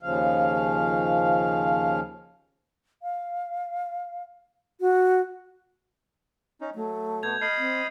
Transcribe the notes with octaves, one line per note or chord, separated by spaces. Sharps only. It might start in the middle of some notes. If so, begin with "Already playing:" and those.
D#2 C#3 F3 F5
F5
F#4
C#4 D#4
F#3 A3
B2 B3 G6 G#6 F7
D#5 B5 D#6 F6 C7
C4